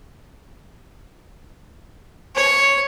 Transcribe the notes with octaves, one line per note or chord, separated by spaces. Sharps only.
C#5